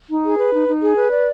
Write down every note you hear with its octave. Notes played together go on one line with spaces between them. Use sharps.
D#4
G#4
B4
D#4
D#4
G#4
B4
D5